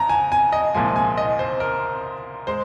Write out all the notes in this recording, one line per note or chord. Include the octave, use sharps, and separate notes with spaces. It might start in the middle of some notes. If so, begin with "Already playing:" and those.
Already playing: F2 A#5
G#5
G#5
D#5
C2 A#2 F3 G#3 G#5
G#5
D#5
C5
A#4
G#3 C5